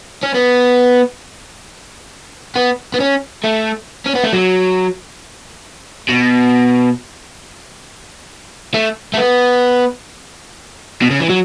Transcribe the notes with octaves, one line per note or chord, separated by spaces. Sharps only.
C#4
B3
B3
B3
C#4
A3
C#4
B3
A3
F#3
B2
A3
A3
B3
B2
C#3
E3
F#3